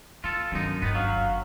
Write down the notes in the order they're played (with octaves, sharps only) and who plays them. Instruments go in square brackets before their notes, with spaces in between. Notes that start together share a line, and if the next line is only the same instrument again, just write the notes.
[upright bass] A#3 [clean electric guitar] F4 A4
[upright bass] G1 D#3 [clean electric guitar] F#2 D#4
[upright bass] G1 F#2 [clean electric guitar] D#3 B3
[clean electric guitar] F#3 [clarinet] F5